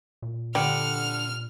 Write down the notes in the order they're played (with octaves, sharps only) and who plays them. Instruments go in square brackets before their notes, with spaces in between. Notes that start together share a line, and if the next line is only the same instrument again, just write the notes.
[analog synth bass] A#2
[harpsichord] D3 [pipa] G3 [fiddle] F6